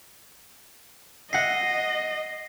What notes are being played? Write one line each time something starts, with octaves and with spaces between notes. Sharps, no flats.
D#5 E5 F#5 A#6 C7